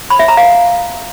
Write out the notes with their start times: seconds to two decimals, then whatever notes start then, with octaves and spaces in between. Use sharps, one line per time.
0.10 B5
0.19 E5
0.28 A#5
0.37 F5